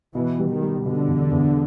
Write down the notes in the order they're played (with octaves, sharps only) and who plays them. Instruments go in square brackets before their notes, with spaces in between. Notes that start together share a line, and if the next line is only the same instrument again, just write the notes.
[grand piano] B2 [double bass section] E3
[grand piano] G3
[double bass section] D#3
[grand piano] G3
[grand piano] B2 [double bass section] D3
[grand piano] E2
E2